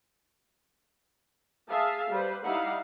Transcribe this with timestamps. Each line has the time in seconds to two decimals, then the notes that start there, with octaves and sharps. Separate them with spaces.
1.69 G#4 E5 F5 A5
2.10 G3 B4 C5
2.44 G3 D#4 E4 F5 F#5